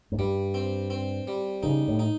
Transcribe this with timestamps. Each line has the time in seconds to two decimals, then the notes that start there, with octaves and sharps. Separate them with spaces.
0.12 G#2
0.18 G2 G3
0.54 C4
0.90 C4
1.27 G3
1.63 C#3 D#4
1.88 A2
1.99 D#4